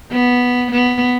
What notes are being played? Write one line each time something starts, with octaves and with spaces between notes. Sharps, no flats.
B3
B3